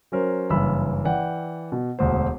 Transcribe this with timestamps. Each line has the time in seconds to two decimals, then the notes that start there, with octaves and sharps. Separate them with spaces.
0.12 F#3 C#4 A#4 C5
0.50 F#1 G2 E3 B5 E6
1.05 E3 D5 F#5 G5
1.72 B2
1.99 E1 D2 C5